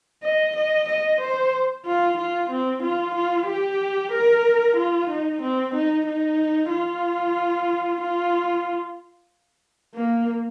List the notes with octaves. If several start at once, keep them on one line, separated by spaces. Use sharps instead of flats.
D#5
D#5
D#5
C5
F4
F4
C4
F4
F4
G4
A#4
F4
D#4
C4
D#4
D#4
F4
F4
A#3